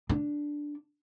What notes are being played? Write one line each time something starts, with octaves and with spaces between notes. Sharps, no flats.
D4